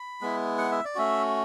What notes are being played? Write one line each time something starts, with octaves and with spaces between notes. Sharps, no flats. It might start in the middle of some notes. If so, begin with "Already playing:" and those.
Already playing: B5
G#3 B3 E4
F#5
E5
D5
A3 C#4 F#4 E5